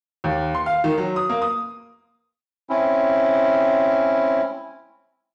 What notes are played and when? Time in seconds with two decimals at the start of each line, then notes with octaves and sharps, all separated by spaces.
0.24 D#2
0.55 C6
0.66 F5
0.84 D#3
0.98 F#3
1.16 D#6
1.29 A#3
1.42 D#6
2.70 C4 C#4 E4